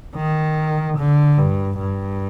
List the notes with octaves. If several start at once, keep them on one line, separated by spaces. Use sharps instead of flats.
D#3
D3
G2
G2